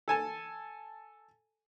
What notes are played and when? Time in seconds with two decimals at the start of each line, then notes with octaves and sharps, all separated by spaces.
0.08 A4 G#5 A5